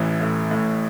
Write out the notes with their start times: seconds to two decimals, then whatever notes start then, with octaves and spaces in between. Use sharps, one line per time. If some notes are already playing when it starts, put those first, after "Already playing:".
Already playing: A1 A2 E3
0.21 A2
0.51 A2